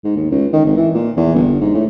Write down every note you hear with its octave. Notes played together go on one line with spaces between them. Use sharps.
G#2
D#2
C#2
D#3
G#1
E3
A#2
E2
G1
G#2
A2